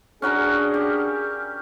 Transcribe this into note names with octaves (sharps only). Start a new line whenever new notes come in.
C#4 D4 F#4 G#4 A#4
G4